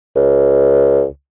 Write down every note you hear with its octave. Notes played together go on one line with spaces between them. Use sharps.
C#2